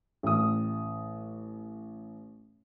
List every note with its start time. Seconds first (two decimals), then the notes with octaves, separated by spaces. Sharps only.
0.23 A1 D#6